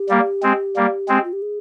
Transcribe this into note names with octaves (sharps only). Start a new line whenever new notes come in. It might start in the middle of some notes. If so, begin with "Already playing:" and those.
Already playing: G4
G3 A#3
G#3 C4
G3 A#3
G#3 C4
F4
G4
G#4